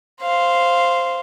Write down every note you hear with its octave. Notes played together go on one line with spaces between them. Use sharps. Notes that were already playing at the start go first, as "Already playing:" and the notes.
C5 F5